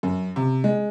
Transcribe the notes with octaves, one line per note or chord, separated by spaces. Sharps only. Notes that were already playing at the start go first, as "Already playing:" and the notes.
F#2
C3
G#3